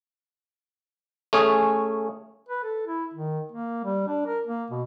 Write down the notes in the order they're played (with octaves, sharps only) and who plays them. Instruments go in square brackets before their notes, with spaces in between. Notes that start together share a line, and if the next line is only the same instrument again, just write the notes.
[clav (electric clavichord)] A3 C#4 G#4
[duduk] B4
A4
E4
D#3
A#3
G3
D4
A#4
A#3
B2